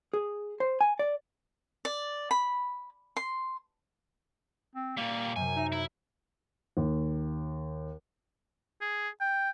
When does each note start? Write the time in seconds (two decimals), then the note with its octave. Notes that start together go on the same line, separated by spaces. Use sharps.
0.14 G#4
0.60 C5
0.81 G#5
0.99 D5
1.85 D5
2.31 B5
3.17 C6
4.75 C4
4.97 A#2 G3 A#3
5.36 F#2 C3 G#5
5.56 D#4 E5
5.72 E4
6.77 D#2
8.81 G#4
9.21 G5